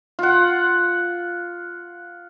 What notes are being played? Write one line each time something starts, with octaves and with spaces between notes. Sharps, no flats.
F4 F#5